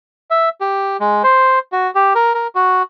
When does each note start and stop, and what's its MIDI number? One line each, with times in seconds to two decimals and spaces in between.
0.31 0.49 76
0.61 0.97 67
1.00 1.23 56
1.23 1.59 72
1.72 1.91 66
1.95 2.13 67
2.15 2.34 70
2.34 2.47 70
2.55 2.82 66